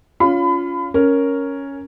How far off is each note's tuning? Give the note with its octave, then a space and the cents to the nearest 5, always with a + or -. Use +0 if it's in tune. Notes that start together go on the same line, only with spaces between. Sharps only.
C#4 +30 F4 +0 B5 +30
C#4 +0 A#4 +0